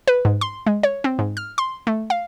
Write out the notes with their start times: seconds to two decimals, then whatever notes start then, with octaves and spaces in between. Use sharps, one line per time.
0.08 B4
0.25 G#2
0.41 C6
0.67 G#3
0.83 C#5
1.04 C4
1.19 G#2
1.37 F6
1.58 C6
1.87 A3
2.10 F5